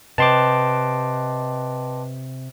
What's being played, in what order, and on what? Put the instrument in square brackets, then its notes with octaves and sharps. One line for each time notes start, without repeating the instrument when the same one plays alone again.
[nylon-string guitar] C3 [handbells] B4 D#5 G5 [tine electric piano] A5 C6 D6